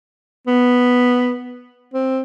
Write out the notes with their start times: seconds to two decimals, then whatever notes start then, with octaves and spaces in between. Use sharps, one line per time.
0.47 B3
1.94 C4